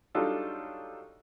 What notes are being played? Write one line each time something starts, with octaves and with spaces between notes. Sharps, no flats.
F#3 G3 D4 D#4 F4 A4